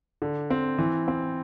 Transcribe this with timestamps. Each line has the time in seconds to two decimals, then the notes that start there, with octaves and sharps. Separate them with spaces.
0.22 D3
0.50 C4
0.78 E3
1.08 C4